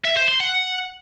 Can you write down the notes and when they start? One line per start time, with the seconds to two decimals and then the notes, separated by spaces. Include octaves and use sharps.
0.05 E5
0.17 C5
0.28 C6
0.40 F#5